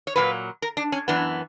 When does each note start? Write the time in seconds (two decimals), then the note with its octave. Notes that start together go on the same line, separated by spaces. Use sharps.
0.07 C#5
0.16 A#2 F#3 A#3 B4
0.62 A#4
0.77 D4
0.92 C#4
1.08 F#2 E3 B3 D4